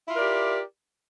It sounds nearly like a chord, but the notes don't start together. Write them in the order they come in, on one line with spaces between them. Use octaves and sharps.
E4 F4 A#4 D5 G4